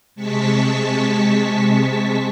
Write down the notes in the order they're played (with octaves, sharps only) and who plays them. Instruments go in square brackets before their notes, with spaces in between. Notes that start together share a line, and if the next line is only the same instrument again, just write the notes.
[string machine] C3 G#3 A5 C#6 B6